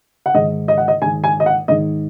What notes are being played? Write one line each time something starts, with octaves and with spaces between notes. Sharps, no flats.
F#5
G#2 D#3 D#5
D#5
F#5
D#5
G#2 D#3 G#5
G#5
D#5
F#5
G#2 D#3 D#5